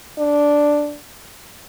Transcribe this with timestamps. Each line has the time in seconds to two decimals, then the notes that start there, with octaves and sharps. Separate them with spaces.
0.18 D4